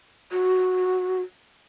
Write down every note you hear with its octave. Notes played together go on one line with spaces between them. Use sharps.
F#4